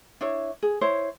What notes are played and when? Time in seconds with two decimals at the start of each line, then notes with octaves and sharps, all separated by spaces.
0.21 D4 E4 C#5
0.63 G#4
0.81 E4 C5 C#5